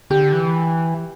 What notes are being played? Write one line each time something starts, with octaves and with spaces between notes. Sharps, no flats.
D3 G4
E3